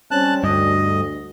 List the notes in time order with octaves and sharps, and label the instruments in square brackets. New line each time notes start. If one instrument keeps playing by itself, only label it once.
[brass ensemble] G3 C4 C#4 [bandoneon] A5 F#6
[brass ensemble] D2 [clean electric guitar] G2 [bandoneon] D#5